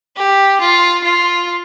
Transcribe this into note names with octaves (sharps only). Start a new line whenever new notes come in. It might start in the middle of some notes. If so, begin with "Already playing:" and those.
G4
F4
F4